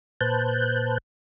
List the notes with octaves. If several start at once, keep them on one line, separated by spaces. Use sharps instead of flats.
A#2 B4 C5 A5 F#6 G6